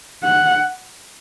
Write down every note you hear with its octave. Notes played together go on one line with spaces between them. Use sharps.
F#5